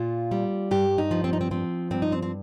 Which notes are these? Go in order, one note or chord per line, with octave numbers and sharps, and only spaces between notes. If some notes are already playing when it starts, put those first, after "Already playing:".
Already playing: A#2 F4
G3
G2 G4
D#4
F3
C4
D#4
C4
F3 C4
G2 C4
D#4
C4
C4